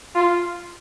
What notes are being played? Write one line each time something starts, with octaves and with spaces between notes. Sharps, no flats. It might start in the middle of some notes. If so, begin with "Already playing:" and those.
F4